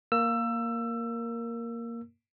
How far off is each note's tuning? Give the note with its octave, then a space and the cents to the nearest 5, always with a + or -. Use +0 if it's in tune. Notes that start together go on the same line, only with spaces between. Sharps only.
A#3 +0 A#4 +0 E6 +20